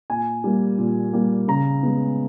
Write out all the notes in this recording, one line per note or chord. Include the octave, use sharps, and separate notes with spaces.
A#2 G#5
G3 A#3
A#2
G3 A#3
C#3 A#5
G#3 B3